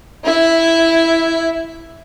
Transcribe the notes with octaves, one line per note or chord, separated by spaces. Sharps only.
E4 E5